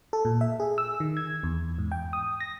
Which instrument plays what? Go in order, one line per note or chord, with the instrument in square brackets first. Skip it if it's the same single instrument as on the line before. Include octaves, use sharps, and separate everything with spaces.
[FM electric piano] A4
A#2
E5
G#4
E6
D#3
G#6
E2
G#2
G5
D#6
A#6